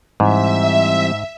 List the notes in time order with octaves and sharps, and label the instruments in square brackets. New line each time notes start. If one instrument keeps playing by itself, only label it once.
[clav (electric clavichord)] G#2 [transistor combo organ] E3 G3 C4 [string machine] E5